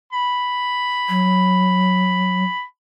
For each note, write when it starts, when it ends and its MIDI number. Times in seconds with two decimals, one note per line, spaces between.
0.13 2.63 83
1.09 2.44 54